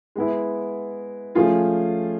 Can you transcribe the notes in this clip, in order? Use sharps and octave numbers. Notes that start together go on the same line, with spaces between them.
G#3 B3 E4
F3 A3 C#4 F4 G#4